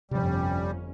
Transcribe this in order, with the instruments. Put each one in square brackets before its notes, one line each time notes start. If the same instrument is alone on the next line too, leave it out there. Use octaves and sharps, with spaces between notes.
[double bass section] G1 F2 C#4 [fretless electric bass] C3 F3 [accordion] G3